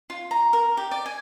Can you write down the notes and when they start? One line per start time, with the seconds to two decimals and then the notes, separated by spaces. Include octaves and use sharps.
0.10 F4
0.31 A#5
0.53 A#4
0.77 G4
0.91 D5
1.06 G#5